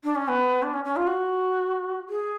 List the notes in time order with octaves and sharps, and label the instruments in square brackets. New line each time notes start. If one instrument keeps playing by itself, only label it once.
[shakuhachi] D4
C#4
B3
D4
C#4
C#4
F4
F#4
G#4